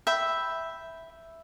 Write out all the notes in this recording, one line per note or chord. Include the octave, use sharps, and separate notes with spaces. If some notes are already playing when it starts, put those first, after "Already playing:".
E5 G5 B5